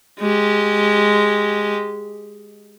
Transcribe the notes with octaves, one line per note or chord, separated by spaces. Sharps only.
G#3 G4